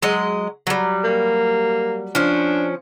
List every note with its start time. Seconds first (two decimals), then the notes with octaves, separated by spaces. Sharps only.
0.02 F#3 G#3 D#5
0.67 F#3 G3
1.04 A#3
2.15 F3 C#4 D4